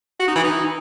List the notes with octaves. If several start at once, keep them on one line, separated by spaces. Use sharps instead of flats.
F#4
D#4
E3
D#4